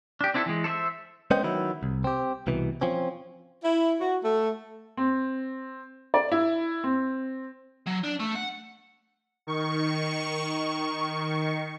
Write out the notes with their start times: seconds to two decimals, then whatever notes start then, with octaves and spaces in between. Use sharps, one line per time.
0.21 D4 G4
0.34 C4 D4 E4 G#4 A4
0.46 E3 G#3
0.64 A4 C5 D5 E5
1.31 G#3 C#4 B4 C5 D#5 G5
1.43 D#3 F#3 B3 E4
1.83 C2
2.04 C4 G4
2.47 C2 B2 E3
2.81 F3 C4 C#4
3.64 E4
4.01 F#4
4.24 A3
4.97 C4
6.14 D5
6.32 E4
6.84 C4
7.86 F#3
8.04 D4
8.19 A3
8.35 F#5
9.47 D#3 C#6